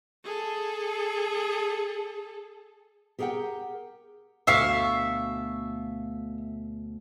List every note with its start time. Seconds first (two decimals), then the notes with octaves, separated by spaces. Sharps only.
0.24 G#4 A4
3.19 G4 G#4 A#4 C#5 F#5 G5
4.47 D2 B2 E5 F5 C#6